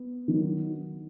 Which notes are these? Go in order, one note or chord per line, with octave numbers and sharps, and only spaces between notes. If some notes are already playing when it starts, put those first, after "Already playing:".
Already playing: B3
D#3 F#3